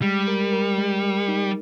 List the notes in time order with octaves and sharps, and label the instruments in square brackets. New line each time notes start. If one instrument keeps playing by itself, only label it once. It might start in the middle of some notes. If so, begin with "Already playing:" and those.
[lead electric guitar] G3 [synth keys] G#3
[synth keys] A#4
A#4
G#3
G#3
D#4